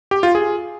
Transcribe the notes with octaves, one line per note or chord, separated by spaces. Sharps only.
G4
F4
G#4